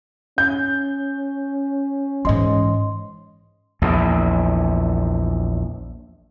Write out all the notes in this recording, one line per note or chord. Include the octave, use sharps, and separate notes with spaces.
C#4 G6
G#2 E3 D#5 C6
A#1 E2